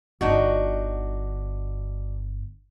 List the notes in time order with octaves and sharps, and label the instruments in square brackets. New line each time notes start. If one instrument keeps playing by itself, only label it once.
[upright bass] G1 D3 [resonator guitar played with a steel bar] D4 D#4 F#4